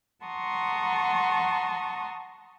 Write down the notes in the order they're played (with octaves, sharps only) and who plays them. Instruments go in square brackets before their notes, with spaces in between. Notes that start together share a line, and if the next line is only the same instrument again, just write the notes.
[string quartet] F#5 A5 A#5 C6 C#6 D#6